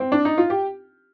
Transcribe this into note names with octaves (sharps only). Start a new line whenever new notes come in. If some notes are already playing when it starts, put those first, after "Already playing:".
C4
D4
D#4
F4
G4